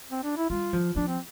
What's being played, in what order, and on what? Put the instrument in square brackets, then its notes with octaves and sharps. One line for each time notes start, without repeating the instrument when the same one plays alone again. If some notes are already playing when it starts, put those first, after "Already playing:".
[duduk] C4
D4
E4
[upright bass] G3 [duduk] F4
[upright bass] F3
[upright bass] F3 [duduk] D4
[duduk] C4